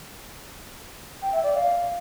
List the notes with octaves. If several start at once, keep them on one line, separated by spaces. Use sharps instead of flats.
G5
E5
D5
F5